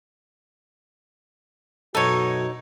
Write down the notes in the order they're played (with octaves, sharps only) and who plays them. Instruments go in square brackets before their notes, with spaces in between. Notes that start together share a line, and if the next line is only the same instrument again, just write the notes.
[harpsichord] F#2 B2 [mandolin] D#4 C#5 [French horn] F#4 [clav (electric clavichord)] A4